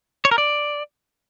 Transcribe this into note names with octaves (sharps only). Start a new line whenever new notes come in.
C#5
A#4
D5